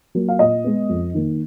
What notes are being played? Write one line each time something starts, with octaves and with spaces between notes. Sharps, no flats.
F#3 A#3
F5
A#2 D#5
G#3 B3
F2
D#3 A#3